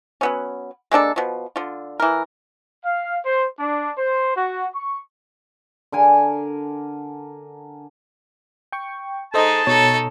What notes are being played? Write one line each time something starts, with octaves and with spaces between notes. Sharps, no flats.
F#3 B3 C#4
G#3 A#3 D4 A4
B2 F3
D3 F4
E3 A#4
F5
C5
D4
C5
F#4
C#6
D3 A#4 G#5
G5 C#6
G#3 D#4 A4 C5 D#5 A5
B2 D#4 A4 C#5